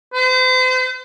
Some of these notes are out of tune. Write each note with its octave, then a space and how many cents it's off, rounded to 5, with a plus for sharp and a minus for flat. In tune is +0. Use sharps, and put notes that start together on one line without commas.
C5 -40